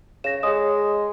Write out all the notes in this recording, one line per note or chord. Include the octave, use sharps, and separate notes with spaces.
C#3 A#6 E7
G#3 G#4 C#5 D#6